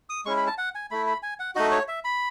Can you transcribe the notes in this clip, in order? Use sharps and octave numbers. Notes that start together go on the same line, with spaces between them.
D#6
G#3 C#4 E4 C#6
B5
A5
F#5
G#5
A3 E4 B5
B5
G#5
F#5
A3 D#4 F#4 D#5
C#5
E5
B5